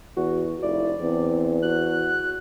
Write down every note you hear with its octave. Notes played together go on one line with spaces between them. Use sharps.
E2 F#4
F1 E4 D5
E2 C4
F#4 F#6